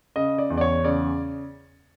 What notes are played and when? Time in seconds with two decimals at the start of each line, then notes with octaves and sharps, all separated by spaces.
0.16 C#3 D#5
0.38 D5
0.50 E2
0.57 D5
0.61 C#5
0.84 C#3 D5